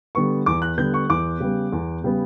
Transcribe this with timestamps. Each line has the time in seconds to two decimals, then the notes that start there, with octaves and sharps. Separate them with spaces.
0.15 D3 G3 B3 C#6
0.46 E2 D6
0.62 F#6
0.78 D3 G3 B3 G6
0.94 C#6
1.09 E2 D6
1.40 C#3 G3 B3
1.72 E2
2.04 C#3 G3 B3